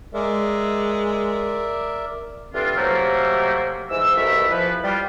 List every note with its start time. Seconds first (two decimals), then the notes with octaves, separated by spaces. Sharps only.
0.14 G#3 A#4 D5 E5
2.54 G2 D3 E3 C4 D4 F4
2.77 C3 F#3 A3 A#3
3.90 G#2 E3 E6
4.15 C2 B2 A3 A4 A#4 E5
4.49 E3 F3 B4
4.83 G3 F4